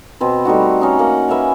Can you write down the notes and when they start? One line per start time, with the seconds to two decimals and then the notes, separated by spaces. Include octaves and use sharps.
0.21 B2 C4 B4
0.45 G3 A3 D#4 F#4
0.81 C#4 D#4
0.99 A#3 F#5
1.29 B4 E5 G#5 A#5